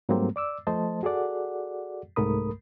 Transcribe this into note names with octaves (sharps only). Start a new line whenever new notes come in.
G#2 F#3 G3 A3 A#3 C4
D5 D6 E6
F3 A3 C5 D#5 A5
F#4 G#4 A4 D5 F#5
C2 G#2 A3 A#4 B5 D#6